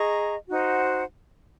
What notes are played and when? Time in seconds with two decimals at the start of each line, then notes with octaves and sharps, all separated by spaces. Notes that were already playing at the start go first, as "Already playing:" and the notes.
Already playing: G#4 D#5 A#5 C#6
0.49 D#4 F#4 C5 F#5